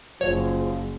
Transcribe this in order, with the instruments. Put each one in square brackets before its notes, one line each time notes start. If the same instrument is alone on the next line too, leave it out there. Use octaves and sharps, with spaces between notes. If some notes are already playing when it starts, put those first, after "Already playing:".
[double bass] F#1 [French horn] F3 [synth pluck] C#5